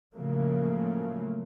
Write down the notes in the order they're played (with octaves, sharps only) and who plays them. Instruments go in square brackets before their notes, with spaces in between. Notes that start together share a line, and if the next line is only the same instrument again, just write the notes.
[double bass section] A2 C#3 F3 F#3 A3 A#3